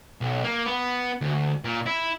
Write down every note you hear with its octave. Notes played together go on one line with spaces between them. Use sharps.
B1
A#3
B3
D2
A#2
E4